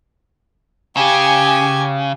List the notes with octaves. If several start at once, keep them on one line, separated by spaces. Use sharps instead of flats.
C#3 G4 G#5